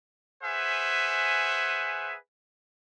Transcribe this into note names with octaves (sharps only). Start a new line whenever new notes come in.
G#4 B4 C5 E5 F#5 G#5